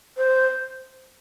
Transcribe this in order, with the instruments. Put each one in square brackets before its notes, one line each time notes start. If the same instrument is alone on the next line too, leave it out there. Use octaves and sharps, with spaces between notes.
[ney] C5